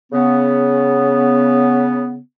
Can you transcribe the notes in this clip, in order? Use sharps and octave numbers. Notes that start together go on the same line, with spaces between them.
C#3 B3